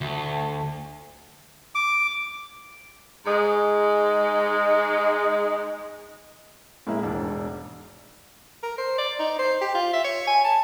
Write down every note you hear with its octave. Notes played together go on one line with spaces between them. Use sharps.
D2
D6
G#2 G#3
A2 G#3 A#3 E4
E1 G#2 D4
A#4
C5
D5
D#4
C5
G4
F4
E5
C#5
G#5
A5